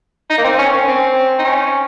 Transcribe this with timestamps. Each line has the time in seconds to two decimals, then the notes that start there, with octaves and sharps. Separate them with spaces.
0.30 D#4
0.37 A#3
0.44 C4
0.58 C#4
0.73 C#4
0.87 C4
1.39 D#4
1.44 C#4